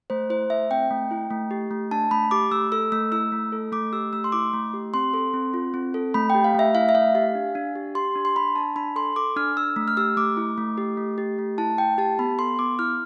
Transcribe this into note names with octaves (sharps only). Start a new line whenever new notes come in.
A3 C5
E4 C5
A3 E5
C4 G5
A3
E4
A3
G4
A3
D4 A5
A3 B5
G4 D6
A3 E6
A4 E6
A3 E6
E4 E6
A3
A4
A3 D6
G4 E6
A3 E6
C6
E4 D6
A3
G4
C4 C6
A4
C4
F4
C4
A4
A3 B5
G5
G4
F5
A3 E5
E4 F5
E5
A3 F5
G4 F5
D4
D4
G4
G4 C6
D4
C6
D4 B5
D4 A5
D4 B5
A4 C6
A4 D6
D4 F6
D4 E6
A3
F6
G4 E6
A3 D6
E4
A3
G4
A3
G4
A3
E4 A5
A3 G5
G4 A5
B3 B5
A4 C6
B3 D6
E4 F6